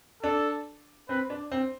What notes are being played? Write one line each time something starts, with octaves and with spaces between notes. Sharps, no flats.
D4 A4
C4 B4
D4
C4